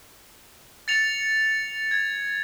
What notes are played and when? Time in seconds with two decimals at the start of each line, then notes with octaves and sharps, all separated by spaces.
0.88 A6 C#7 F7
1.91 G#6